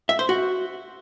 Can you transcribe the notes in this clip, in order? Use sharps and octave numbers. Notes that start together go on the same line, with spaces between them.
E5
C5
F#4